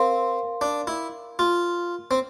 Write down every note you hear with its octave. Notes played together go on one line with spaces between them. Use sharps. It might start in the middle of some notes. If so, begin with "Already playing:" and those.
Already playing: C4 A#4 F5 C6
D4
E4
F4
C4